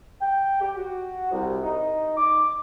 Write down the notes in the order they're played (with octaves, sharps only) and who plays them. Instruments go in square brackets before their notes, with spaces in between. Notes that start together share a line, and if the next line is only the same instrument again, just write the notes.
[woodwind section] G5
G4
F#4
C2
D#4
D6